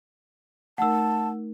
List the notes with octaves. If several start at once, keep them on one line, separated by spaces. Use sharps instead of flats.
A3 D#4 A#4 F#5 A5 E6